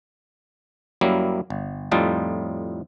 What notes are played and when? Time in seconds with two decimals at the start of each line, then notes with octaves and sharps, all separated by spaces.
1.01 F#2 F#3 G3 A#3 E4
1.50 G1
1.91 F2 A2 G3 D#4 F4 A5